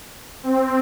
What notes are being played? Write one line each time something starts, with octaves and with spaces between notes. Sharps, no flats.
C4